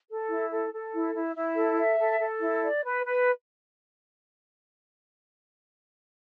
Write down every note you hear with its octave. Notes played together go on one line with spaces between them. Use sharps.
A4
E4
A4
A4
E4
E4
E4
A4
E5
A4
A4
E4
D5
B4
B4